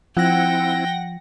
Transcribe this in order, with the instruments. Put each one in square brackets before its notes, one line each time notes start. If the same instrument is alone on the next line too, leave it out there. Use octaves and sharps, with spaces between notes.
[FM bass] F3 [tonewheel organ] C4 E4 [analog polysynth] F#5 A#6 [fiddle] G5